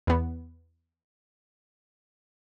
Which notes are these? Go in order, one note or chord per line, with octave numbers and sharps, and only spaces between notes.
E2 B3